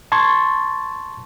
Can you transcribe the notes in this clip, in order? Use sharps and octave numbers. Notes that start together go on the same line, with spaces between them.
A5 C6 C#6 G#6 A6